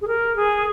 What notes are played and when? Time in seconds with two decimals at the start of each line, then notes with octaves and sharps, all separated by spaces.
0.01 G#4
0.08 A#4
0.36 G#4